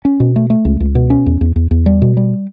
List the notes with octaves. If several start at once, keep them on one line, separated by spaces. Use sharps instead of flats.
C#4
B2
A3
A3
C#2
C#2
B2
C#4
E2
E2
E2
E2
G3
B2
G3